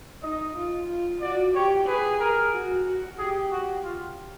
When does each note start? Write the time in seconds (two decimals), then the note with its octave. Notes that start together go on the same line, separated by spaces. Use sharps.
0.22 D#4 D#5
0.56 F4
0.89 F4
1.21 F#4 D5
1.55 G4 C#5
1.87 G#4 B4
2.20 A#4
2.54 F#4
2.85 F#4
3.18 G4 G#4
3.52 F#4
3.84 F4